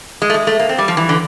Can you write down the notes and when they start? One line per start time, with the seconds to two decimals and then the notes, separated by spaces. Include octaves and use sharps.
0.22 G#3
0.30 A3
0.34 G#3
0.47 A3
0.60 A#3
0.69 C4
0.78 G3
0.88 F3
0.97 E3
1.09 D3